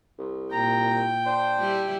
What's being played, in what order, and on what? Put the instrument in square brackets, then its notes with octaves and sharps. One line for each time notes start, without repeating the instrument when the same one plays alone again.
[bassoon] C2
[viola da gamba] A#2 [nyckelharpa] G5 [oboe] A#5
[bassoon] D4 [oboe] C5
[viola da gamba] G3 E4